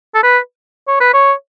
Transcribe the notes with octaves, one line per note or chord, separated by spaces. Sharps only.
A4
B4
C#5
B4
C#5